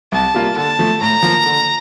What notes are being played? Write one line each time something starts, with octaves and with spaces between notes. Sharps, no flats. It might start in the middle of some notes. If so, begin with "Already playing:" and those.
C2 A5
C3 G3 A#3 F4
D3 A5
F3 A3
A2 A#5
F3 A#3
D3